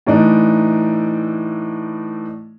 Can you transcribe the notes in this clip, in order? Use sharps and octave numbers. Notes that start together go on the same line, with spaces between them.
A2 E3 D4 D#4